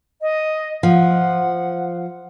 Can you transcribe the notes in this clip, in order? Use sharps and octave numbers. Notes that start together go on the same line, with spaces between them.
D#5
F3 F#5